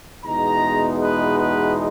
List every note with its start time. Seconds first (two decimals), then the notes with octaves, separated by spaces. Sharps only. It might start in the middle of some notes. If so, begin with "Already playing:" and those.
0.24 E2 B2 G#3 B3 D#4 A#5
0.99 B4
1.37 B4